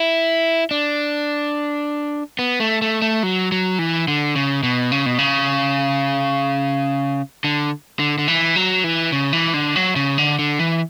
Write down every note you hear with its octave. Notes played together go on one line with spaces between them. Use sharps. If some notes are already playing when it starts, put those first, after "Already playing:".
Already playing: E4
D4
B3
A3
A3
A3
F#3
F#3
E3
D3
C#3
B2
C#3
B2
C#3
D3
D3
D3
E3
F#3
E3
C#3
E3
D3
F#3
C#3
D3
D3
E3